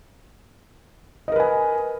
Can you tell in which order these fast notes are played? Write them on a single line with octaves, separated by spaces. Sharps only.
D#5 A#4 B4 G#5